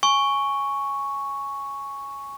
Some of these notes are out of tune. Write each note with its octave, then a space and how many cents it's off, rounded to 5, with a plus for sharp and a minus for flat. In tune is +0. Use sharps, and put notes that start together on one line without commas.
G#5 +0 C#6 +0